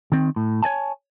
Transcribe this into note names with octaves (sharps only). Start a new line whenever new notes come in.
D#3 C4
A2
C#5 D5 G#5 A5